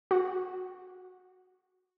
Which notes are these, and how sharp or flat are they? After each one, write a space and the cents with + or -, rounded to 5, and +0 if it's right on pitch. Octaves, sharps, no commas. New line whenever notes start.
F#4 -10